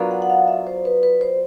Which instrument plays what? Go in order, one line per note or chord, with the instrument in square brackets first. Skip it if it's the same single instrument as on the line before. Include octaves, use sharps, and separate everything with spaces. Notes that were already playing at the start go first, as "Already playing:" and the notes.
Already playing: [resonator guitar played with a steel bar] F#3 B3 D4 F4 A#4
[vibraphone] F#5
F#5
F5
E5
C5
B4
B4
C5